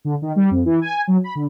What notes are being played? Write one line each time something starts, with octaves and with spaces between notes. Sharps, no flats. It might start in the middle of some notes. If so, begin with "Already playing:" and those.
D3
D#3
G3
F2
E3
G#5
F#3
B5
D3